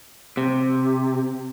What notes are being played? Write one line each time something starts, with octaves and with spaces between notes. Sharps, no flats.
C3